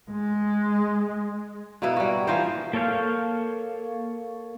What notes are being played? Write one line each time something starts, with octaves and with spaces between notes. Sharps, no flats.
G#3
B2 A#3 B3 E4
G3 F#4
E3 F3 A#4 C5
A#3 A4 C#5 F5 G6